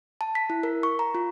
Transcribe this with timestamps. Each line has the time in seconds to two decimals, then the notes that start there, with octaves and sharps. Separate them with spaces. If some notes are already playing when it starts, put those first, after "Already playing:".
0.21 A5
0.35 B6
0.50 E4
0.63 A#4
0.83 C#6
0.99 A#5
1.15 F4